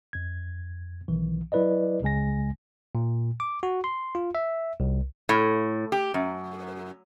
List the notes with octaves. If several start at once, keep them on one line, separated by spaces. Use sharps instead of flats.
F2 G#6
B1 D#3 E3
F#3 E4 B4 D5 D#5
C#2 C#3 G#3 G#5 A#6
A#2
D6
F#4
C6
F4
E5
C2
A2
G4
F#2